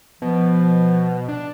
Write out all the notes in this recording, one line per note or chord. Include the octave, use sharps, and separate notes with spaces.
B2 F3
D4